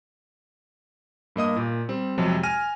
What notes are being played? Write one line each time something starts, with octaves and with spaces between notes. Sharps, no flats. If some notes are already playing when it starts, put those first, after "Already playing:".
G2 A#3 D#5 D#6
A#2
G3 C4
F2 C3 F#3 G#3
G#5 F6 A#6 D#7